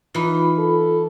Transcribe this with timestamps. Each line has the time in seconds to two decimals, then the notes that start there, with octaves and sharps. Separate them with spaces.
0.15 E3 D#4 F4 B5
0.59 A4